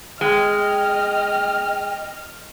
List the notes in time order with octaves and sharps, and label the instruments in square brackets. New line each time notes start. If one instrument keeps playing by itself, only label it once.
[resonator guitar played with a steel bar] G#3 [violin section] D#5 [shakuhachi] G5 [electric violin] F6